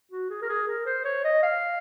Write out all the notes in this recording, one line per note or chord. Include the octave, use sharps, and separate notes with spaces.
F#4
G#4
A#4
G#4
A#4
C5
C#5
D#5
F5